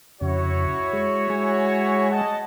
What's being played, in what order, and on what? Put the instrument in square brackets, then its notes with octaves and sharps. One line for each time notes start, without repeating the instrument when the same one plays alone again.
[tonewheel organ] F2 C#3 [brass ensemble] E4 F#4 C#5
[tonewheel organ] G#3
G#3 G#5
[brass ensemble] D#5 F#5 A5